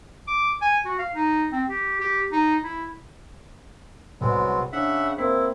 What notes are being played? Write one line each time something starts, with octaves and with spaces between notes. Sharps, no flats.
D6
G#5
F#4
F5
D#4
C4
G4
G4
D#4
E4
C2 F#3 G#3 B3 C4
C#3 D4 E5 F#5
A#3 C4 E4 B6